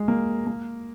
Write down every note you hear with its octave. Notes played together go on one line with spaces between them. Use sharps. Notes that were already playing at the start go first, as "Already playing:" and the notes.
Already playing: G#3
A#3
A#3